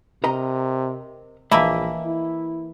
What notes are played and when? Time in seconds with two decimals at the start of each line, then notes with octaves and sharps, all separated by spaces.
0.24 C3 A#4 D#5 A#5
1.51 A#1 E3 A#3 D#5 E5 A5 B5
2.06 E4